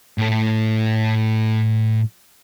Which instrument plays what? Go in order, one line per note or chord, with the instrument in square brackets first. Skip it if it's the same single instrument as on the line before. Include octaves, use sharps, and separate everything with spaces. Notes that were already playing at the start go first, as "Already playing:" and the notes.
[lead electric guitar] A2 A4